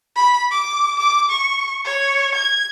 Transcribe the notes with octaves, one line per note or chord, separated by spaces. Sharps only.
B5
D6
D6
C#6
C#5
G#6